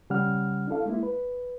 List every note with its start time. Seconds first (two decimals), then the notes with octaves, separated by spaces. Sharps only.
0.10 C#3 G3 C#4 F#5 F6
0.68 D4 E4 A4 F5
0.86 G#3 A#3 E4
1.03 B4